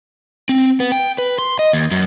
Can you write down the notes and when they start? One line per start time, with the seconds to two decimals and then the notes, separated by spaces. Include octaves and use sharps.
0.49 C4
0.80 B3
0.92 G5
1.18 B4
1.38 C6
1.59 D#5
1.73 D#2
1.91 F#2